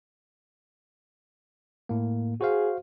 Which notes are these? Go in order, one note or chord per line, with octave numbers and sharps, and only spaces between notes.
A2 A#3
F#4 G#4 C5 F5